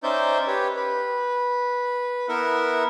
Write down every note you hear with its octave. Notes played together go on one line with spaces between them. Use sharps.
C#4 D#4 C5 D5 E5 G6
G4 B4 C#5
B4
B3 E4 A#4 E5 F#5